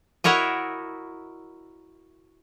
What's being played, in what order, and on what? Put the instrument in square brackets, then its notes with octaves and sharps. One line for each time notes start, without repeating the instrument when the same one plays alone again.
[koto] E4 F#4 A#4 C#5 D#5